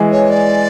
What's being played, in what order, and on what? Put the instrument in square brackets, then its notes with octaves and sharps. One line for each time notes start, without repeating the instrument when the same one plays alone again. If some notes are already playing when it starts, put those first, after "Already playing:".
Already playing: [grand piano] E3 G#3
[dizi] C#5
D5